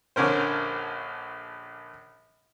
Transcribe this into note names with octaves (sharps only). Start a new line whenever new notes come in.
A#1 D3 C#4 A#4 C5